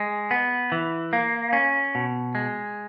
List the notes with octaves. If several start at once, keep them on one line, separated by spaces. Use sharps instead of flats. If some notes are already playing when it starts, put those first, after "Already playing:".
Already playing: G#3
B3
E3
A#3
C#4
B2
G#3